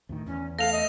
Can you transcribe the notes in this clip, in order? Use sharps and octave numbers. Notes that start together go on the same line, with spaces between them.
D2 A2 D#3
E2 C#4
A3 A4 F5 A#6 F7
D#5